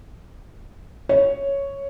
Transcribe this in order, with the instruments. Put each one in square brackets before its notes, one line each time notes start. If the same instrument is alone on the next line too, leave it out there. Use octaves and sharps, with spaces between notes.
[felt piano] C#5